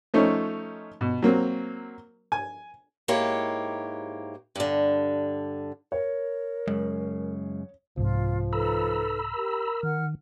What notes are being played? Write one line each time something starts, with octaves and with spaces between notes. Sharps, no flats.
F3 A3 C#4 D#4
B2
F#3 A#3 C4
G#5
G#2 A#3 E4 G4 C#5
G2 D3
A#4 C#5
F#2 C#3 G#3
C2 G#2 F3 F4
D#4 A4 B4 A#5 B5 E6
G4 A#4
D#3 F#5 F6